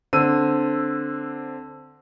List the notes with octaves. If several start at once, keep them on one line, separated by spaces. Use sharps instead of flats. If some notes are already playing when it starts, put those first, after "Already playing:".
D3 C4 E6 D#7